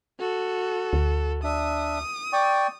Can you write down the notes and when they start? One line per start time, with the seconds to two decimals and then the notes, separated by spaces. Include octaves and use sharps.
0.19 F#4 A4
0.93 D2
1.44 D4 E5 D#6
2.33 D5 G5 C#6